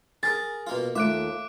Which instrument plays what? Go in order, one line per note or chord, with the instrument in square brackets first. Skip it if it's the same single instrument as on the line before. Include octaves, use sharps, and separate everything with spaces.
[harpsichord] G#4 A#4 [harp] A6
[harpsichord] B2 A#3 F4
[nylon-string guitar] D#2 A3 F4 [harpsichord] E5 [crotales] D6 F#6 D7